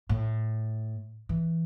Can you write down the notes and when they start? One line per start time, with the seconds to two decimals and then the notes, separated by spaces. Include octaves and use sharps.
0.09 A2
1.29 E3